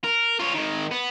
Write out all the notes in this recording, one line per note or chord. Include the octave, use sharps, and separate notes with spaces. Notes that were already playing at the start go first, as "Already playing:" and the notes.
A#4
F4 C#5
D#3 G#3
B3